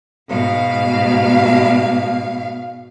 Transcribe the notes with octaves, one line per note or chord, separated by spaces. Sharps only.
G#2 B2 F5